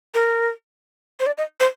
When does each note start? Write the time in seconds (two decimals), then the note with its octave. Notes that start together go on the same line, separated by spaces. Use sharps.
0.14 A#4
1.20 C5
1.26 D5
1.38 D#5
1.60 C5